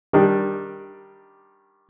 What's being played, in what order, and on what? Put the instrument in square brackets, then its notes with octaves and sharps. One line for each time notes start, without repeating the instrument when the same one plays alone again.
[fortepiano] D#3 G3 D4